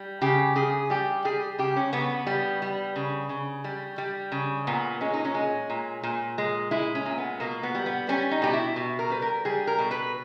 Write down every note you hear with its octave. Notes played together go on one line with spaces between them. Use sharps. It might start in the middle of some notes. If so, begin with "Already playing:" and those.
Already playing: G3
C#3 G4
C#3 G#4
G3 G4
G3 G#4
C#3 G4
C#4
C#3 B3
G3
G3
C#3
C#3
G3
G3
C#3
A#2 B3
G#3 C#4
D#4
C#4
G#3
A#2
A#2
G#3
G#3 E4
C#4
A#2
B3
B2 A#3
B3
G3
B3
G3 C#4
D#4
B2 G4
E4
B2
A#4
G3 B4
A#4
G3 G#4
A#4
B2
B4